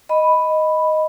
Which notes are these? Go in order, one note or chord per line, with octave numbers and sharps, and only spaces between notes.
D#5 B5